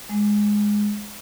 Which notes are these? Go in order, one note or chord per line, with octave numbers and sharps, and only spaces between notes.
G#3